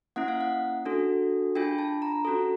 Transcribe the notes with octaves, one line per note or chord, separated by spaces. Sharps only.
A#3 C#4 E4 F#5
F5
F#5
D4 F#4 A4
D4 F4 G#4 G5
A5
A#5
C#4 F#4 A4